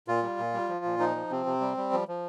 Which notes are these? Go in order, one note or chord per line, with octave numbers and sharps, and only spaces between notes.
A#2 F4
G3
A#2
G3
F3
A#2
F3 D#4
F3
C3 C4
C3
G3
G3
F3
F3